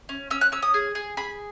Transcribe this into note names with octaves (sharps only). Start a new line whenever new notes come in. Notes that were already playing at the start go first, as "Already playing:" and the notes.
C#4
C#4 E6
F#6
C#4 E6
D#6
G#4
G#4
G#4 B5